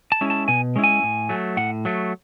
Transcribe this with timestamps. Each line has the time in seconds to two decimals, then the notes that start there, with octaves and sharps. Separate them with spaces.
0.12 A5
0.21 G#3 C#4 E4
0.30 A5
0.48 B2 G#5
0.76 G#3 C#4 E4
0.84 G#5
1.03 A2
1.29 F#3 A3
1.57 A2 F#5
1.85 F#3 A3